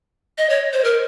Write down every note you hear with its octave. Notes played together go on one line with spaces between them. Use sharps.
D#5
C#5
C5
A#4